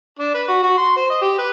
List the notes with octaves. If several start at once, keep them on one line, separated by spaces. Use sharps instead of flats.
D4
B4
F#4
F#4
C6
C5
D#5
G4
B4